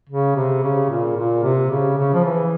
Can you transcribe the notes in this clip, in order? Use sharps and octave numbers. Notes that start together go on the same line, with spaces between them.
C#3
C3
C#3
A#2
A#2
C3
C#3
C#3
F3
E3